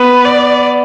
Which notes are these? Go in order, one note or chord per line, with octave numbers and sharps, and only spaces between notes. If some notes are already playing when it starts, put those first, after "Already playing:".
Already playing: B3 B4
D5